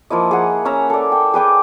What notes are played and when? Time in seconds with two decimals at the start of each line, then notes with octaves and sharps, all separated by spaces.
0.10 F3 A#3 E4 D#5
0.31 G#4 F#5
0.65 C#4 E5 A#5
0.90 A4 D5
1.12 G5
1.34 G#4 B4 G5 D6